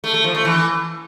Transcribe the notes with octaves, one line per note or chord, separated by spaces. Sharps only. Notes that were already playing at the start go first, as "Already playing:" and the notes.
A3
A3
F3
A3
E3